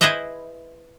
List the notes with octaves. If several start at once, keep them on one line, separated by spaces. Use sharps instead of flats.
E4 G#4 B4 C5 D#5 E5